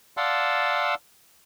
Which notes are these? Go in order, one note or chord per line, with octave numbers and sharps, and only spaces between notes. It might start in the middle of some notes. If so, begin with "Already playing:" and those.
D5 F5 F#5 A5 C6 E6